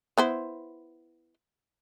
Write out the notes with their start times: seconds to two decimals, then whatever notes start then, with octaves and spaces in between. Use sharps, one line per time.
0.18 B3 E4 C5